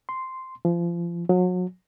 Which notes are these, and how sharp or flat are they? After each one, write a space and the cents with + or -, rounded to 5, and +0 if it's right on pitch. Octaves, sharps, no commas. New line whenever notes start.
C6 -5
F3 -30
F#3 -35